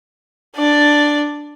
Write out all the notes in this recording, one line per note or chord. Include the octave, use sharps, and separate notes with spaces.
D4 D5